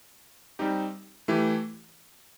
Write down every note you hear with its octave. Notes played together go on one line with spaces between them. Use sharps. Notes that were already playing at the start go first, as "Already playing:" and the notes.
G3 C4 D#4 G4
E3 A3 E4 G4